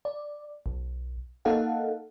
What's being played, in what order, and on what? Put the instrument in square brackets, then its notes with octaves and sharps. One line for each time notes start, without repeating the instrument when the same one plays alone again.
[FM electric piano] D5
B1
A#3 D#4 A4 F5 F#5